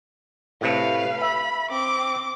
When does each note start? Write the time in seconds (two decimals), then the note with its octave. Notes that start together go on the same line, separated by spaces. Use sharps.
0.61 A2 C3 A3 B4 F5
1.22 E5 B5
1.70 C4 D6